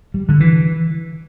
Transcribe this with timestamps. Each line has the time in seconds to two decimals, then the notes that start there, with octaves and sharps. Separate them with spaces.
0.14 G3
0.29 D3
0.40 E3